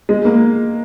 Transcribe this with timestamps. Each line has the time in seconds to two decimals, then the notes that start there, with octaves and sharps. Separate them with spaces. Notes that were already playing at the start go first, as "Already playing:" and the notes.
0.09 G#3
0.25 A#3